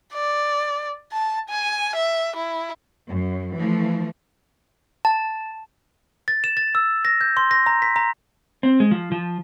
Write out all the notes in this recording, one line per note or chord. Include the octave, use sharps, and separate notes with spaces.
D5
A5
G#5
E5
E4
F#2
E3 F3 A3
A5
A6
E7
A6
E6
A#6
G6
C6
A#6
A#5
B6
A#5
C4
G#3
F3
F3